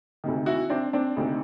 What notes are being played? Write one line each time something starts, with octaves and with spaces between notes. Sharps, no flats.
D2 C3 D#3
E4 F#4
C4 D4
C4 D4
D2 C3 D#3